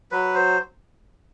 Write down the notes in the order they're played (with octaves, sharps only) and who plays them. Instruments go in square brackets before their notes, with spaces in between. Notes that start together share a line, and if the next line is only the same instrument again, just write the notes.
[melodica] F#3 B4
C5